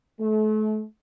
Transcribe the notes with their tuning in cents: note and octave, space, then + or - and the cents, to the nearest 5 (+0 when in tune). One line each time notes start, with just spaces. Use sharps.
A3 -35